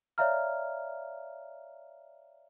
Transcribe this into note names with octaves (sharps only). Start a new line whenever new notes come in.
C#5 D5 E5 F5 A#5 F6